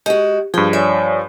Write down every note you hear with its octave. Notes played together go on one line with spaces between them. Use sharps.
G#3 F#4 G4
G2 F3 G#4 G5
C#5 D5 E5 G#5